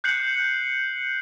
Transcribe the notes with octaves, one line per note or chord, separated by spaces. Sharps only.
F#6 G6 C7 C#7 F#7